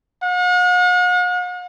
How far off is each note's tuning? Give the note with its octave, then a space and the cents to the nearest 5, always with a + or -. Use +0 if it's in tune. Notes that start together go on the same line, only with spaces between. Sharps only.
F#5 -45